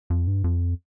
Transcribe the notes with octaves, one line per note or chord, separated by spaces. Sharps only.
F2
G2
F2